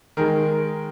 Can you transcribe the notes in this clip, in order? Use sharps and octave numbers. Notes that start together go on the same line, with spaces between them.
D#3 G#3 A#4